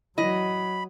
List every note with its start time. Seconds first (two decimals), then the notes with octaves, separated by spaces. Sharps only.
0.18 E3 F#3 D#5 B5